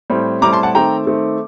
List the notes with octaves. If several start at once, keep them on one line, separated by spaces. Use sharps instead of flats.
A2 G3 C4
A2 G3 C4 A#5 D6
A5 C6
F#5 A5
D#3 A3 C4 G5 A#5
D#3 A3 C4